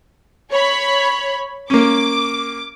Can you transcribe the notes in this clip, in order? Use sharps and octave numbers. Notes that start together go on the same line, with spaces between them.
C#5 B5
A#3 C#4 D6